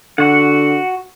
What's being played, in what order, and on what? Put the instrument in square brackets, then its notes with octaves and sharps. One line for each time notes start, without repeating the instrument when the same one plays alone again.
[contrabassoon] D3 [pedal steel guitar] F#4 F#5